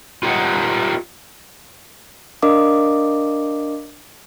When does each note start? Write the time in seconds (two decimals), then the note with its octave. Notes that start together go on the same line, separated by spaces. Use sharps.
0.23 F4 G4 A#4 C#5 D#5 F#5
2.42 D4 A#4 D#5 F5 D6